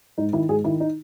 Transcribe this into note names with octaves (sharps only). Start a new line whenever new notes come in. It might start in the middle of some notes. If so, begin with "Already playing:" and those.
G#2 D#4
D#3 E4
G#2 G#4
D#3 E4
D#4